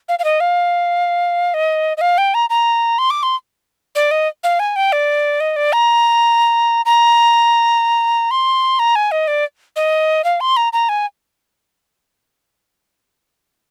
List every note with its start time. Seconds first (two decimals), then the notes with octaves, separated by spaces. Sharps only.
0.09 F5
0.19 F5
0.24 D#5
0.40 F5
1.54 D#5
1.97 D#5
2.01 F5
2.18 G5
2.34 A#5
2.50 A#5
2.98 C6
3.10 D6
3.23 C6
3.95 D5
4.11 D#5
4.43 F5
4.59 G#5
4.76 G5
4.92 D5
5.40 D#5
5.56 D5
5.73 A#5
6.85 A#5
8.31 C6
8.79 A#5
8.95 G#5
9.11 D#5
9.27 D5
9.76 D#5
10.24 F5
10.40 C6
10.56 A#5
10.73 A#5
10.89 G#5